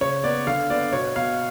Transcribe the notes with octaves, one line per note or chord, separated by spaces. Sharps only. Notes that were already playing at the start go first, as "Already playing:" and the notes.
C#3 C#5
B3 D5
D3 F5
B3 D5
B2 C#5
B2 F5